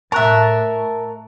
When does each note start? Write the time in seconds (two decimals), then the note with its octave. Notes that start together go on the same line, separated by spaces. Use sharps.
0.12 A2 A#4 E5 A5 C#6 F#6